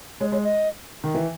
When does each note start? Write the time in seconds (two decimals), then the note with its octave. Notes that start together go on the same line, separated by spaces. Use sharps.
0.20 G#3 C#5
0.32 G#3 C#5
0.44 D#5
1.04 D#3
1.15 E3